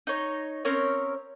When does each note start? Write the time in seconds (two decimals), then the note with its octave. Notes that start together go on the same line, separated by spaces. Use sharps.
0.07 D#4 C#5
0.65 C4 C#4 A#4 C#5